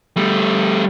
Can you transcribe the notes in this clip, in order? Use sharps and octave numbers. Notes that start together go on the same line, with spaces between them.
G3 A3